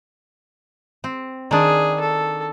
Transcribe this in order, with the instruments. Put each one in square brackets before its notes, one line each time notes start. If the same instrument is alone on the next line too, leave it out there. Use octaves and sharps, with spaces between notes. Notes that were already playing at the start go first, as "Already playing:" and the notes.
[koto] C4
[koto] D#3 D4 [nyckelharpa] G#4
[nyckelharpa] A4